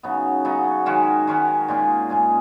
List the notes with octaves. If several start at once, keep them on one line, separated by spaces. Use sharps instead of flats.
C#3 F#3 B3 D#4
C#3 F#3 B3 D#4
D#3 G#3 C#4 F#4
D#3 G#3 C#4 F#4
A#2 G#3 C#4 G#4
A#2 G#3 C#4 G#4